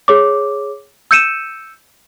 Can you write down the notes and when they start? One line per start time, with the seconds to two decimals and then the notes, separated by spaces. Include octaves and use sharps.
0.08 G#4 C#5 D6
1.11 E6 G6 C#7 D#7 E7